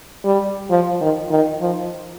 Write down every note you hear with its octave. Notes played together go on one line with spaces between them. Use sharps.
G3
F3
D#3
D#3
F3